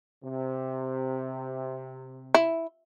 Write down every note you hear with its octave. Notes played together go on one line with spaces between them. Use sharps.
C3
E4